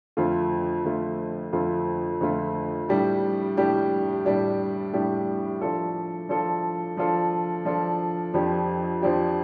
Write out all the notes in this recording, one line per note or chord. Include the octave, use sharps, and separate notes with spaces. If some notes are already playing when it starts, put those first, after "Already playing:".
F2 D3 A3 F4
F2 D3 A3 F4
F2 D3 A3 F4
F2 D3 A3 F4
A2 G3 D4 G4
A2 G3 D4 G4
A2 G3 D4 G4
A2 G3 D4 G4
F3 D4 F4 A4
F3 D4 F4 A4
F3 D4 F4 A4
F3 D4 F4 A4
F2 F3 D4 G4
F2 F3 D4 G4